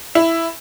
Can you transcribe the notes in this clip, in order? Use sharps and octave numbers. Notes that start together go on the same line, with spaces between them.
E4